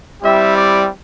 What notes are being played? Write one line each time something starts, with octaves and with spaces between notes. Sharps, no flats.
G3 C4 E4 G4 E5
D5